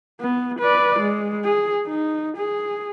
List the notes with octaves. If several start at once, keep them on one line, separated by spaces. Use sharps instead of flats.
B3
B4 D5
G#3
G#4
D#4
G#4